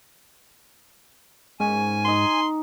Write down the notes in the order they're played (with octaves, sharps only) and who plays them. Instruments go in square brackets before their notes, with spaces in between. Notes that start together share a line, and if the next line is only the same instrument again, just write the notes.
[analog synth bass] G#2 [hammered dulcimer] C#4 [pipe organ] G#5
[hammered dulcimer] D#4 D6 [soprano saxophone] C6